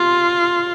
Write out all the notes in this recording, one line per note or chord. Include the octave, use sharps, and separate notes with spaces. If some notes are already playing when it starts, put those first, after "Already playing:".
Already playing: F4 C6